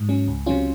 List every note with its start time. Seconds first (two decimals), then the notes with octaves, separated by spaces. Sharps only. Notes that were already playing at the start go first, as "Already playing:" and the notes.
Already playing: G#2
0.09 F#3 C#4
0.28 C#2
0.46 C3 F#3 C#4 F4